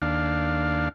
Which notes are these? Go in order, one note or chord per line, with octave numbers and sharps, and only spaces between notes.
D#2 D4 F5